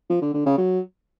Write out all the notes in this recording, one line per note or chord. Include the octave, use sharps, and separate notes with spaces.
F3
D3
D3
C#3
F#3